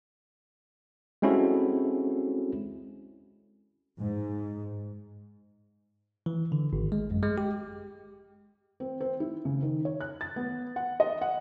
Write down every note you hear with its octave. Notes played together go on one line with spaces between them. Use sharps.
G#3 C4 C#4 E4 F#4 A4
G#2
E3
D3
G#1
G#3
F#2
G#3
G4
C4
C4
E4
C#3
D#3
C#5
F#6
A6
B3
F#5
D#5
F#5